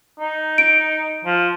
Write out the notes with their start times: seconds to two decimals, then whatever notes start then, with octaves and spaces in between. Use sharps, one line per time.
0.19 D#4
0.58 D7
1.25 F3